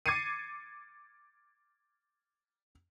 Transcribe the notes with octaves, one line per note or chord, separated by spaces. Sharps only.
D6 G#6 A6 C7 C#7 D#7